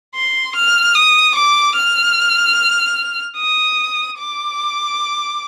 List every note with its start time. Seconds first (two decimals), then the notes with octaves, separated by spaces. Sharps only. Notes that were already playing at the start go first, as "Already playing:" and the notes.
0.15 C6
0.56 F6
0.95 D#6
1.36 D6
1.76 F6
3.38 D#6
4.19 D6